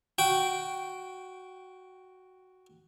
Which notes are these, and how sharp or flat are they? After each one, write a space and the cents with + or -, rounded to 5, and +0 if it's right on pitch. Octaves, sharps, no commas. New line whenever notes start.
F#4 +0 G5 -15